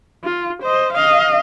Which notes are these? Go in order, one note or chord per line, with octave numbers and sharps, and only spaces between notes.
F4
C5 D#5
D#5 F5